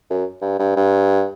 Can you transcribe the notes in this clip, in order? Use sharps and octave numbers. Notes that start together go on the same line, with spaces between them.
F#2
G2
G2
G2